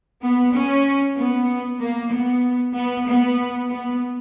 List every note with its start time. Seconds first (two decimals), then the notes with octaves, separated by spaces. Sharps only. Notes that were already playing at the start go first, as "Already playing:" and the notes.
0.21 B3
0.52 C#4
1.16 B3
1.79 A#3
2.10 B3
2.74 B3
3.07 B3
3.70 B3